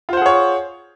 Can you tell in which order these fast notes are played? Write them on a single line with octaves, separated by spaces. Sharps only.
F4 C5 F#5 G#4 C#5